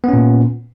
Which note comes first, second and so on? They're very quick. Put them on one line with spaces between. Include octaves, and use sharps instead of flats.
B3 C#4 A#2